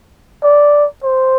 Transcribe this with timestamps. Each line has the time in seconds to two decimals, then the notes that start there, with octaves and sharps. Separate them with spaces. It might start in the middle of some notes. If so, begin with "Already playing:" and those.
0.43 D5
1.04 C5